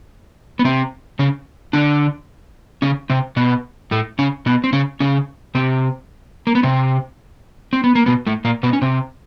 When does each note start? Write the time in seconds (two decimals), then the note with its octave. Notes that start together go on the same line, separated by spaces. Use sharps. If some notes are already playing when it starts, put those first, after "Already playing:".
0.59 B3
0.64 C3 C4
1.19 C#3 C#4
1.73 D3 D4
2.82 C#3 C#4
3.10 C3 C4
3.36 B2 B3
3.91 A2 A3
4.19 C#3 C#4
4.46 B2 B3
4.64 C4
4.73 C#3 C#4
5.00 C#3 C#4
5.55 C3 C4
6.47 A#3
6.55 B3
6.63 C3 C4
7.73 C4
7.84 B3
7.95 A#3
8.06 B2 B3
8.26 A2 A3
8.45 A#2 A#3
8.63 B2 B3
8.73 C#4
8.82 C3 C4